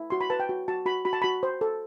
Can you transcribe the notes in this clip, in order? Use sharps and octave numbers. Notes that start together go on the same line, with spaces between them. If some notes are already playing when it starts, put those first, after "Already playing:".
Already playing: E4
F#4 C6
B5
B4 A5
G5
F#4
F#4 A5
F#4 B5
F#4 B5
A5
F#4 B5
C5
A4